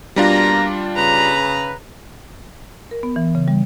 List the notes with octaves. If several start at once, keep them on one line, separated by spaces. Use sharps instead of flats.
B2 G3 A#3 D4 F4 A#5
C#3 B4 A#5
A#4
B3
E3
C#3
G3